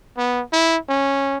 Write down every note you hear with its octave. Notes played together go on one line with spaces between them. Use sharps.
B3
E4
C#4